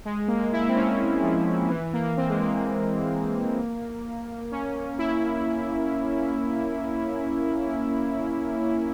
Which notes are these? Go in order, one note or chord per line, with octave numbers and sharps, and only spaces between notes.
G#3
A#3
E4
A#3
C4
C#4
F3
E3
A#3
C4
G#3
A#3
C#4
E4